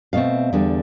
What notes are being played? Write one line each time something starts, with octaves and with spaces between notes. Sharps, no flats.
B2 A3 C4 F5
E2 D3 G3 D4